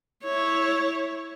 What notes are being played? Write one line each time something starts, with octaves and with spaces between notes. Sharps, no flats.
E4 C#5